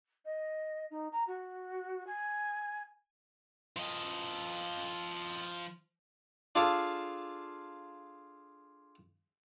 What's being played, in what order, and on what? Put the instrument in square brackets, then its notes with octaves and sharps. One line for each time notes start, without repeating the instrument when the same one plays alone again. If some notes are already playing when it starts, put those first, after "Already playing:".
[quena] D#5
D#4
A#5
F#4
G#5
[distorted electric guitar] F3 D#5
[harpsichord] D4 F4 G#4 A4 F5 D6